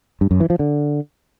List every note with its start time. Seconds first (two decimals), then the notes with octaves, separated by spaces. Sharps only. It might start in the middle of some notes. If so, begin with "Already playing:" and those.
0.21 G2
0.31 F#2
0.40 E3
0.50 F3
0.59 D3